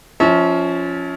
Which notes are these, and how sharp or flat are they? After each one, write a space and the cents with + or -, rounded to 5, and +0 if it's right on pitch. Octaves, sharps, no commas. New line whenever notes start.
F3 +0 C#4 +10 E5 -35